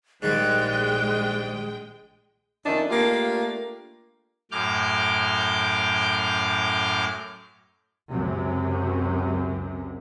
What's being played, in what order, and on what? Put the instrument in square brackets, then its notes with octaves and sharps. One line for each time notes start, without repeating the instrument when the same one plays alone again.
[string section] A#1 G#3 G5 [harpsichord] G#2 D#3 G3 [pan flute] G#4 [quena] F#6
[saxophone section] F2 D#3 C#4 D4 D#5 E5
A3 A#3 D4 F4 G4
[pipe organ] F#2 A2 D6 F6 G6
[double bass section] C#2 F#2 C3